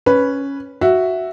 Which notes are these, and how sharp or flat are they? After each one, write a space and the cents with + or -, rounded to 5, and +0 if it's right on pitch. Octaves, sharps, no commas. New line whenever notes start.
C#4 +0 B4 +0
F#4 +0 E5 +0